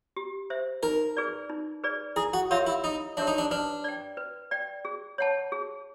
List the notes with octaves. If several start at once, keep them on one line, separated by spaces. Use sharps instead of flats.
G4
C5 E5
D#4 A#4
G#4 B4 D5
D#4
G#4 B4 D5
E4 G#4
F#4
F4 G4 A#4 C#5 E5
E4
D#4 E4
D4 G4 A#4 C#5 E5
D#4
D4
D4 B4
D5 G5
B4
D5 G5
G#4
C#5 F#5 A5
G#4